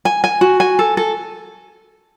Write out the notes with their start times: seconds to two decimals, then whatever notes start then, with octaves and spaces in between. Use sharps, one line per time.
0.05 G#5
0.24 G#5
0.41 F#4
0.60 G#5
0.79 A4
0.97 A4